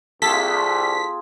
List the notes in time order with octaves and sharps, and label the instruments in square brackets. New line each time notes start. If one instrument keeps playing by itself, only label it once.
[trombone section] C2 [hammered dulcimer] C4 F4 G#4 [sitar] A4 [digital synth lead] B6